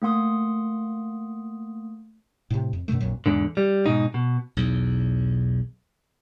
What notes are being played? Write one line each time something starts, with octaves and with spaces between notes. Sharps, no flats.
A3 A#3 F#5 C6 D#6
A2 C3
F2
F#2 B2 D#3 A3
A#1 F2 A#2 F#3
E2 G#2 D3
G3
G#2 B2 D#4
B2
B1 E2